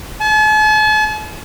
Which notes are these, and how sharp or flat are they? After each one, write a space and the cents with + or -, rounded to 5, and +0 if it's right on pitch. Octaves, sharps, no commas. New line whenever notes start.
A5 -45